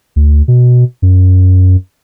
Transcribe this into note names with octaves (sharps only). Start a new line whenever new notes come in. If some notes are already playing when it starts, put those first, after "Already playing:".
D2
B2
F#2